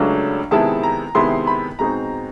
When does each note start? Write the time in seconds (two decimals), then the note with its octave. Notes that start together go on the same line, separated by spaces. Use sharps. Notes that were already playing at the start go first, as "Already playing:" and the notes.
Already playing: C#2 C#3 F#3 A3 D4
0.51 C3 D#3 G#3 B3 E4 A5
0.83 A#5
1.15 C3 D#3 G#3 B3 E4 C6
1.47 B5
1.79 B2 G#3 C4 D#4 A#5